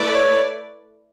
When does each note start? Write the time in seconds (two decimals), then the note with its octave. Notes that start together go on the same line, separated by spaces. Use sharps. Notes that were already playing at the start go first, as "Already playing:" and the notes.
Already playing: A3 E4 B4 D5
0.14 C#5